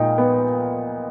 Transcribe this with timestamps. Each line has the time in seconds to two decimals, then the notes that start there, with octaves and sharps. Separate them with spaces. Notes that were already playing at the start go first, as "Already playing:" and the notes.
Already playing: A#2 G#3 D#4 G5
0.18 B3